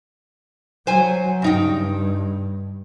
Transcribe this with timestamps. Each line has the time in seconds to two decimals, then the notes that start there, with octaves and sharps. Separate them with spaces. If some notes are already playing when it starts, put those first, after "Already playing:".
0.87 F#3 C5 G#5
1.42 G2 C#3 D#4 G5